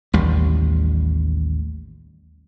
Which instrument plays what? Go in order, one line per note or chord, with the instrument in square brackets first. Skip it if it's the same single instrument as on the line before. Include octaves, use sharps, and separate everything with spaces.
[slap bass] A1 D#2 G3